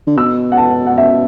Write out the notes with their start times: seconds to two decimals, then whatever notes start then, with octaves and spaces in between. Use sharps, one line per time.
0.07 D3
0.17 B2 E6
0.52 F#5
0.57 A5
0.86 F#5
0.98 E5